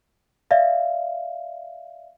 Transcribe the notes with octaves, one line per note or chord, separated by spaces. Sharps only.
D5 E5 F5